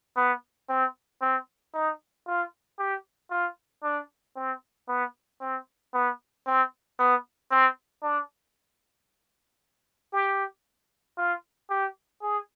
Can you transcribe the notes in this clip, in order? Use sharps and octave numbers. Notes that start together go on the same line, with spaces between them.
B3
C4
C4
D#4
F4
G4
F4
D4
C4
B3
C4
B3
C4
B3
C4
D4
G4
F4
G4
G#4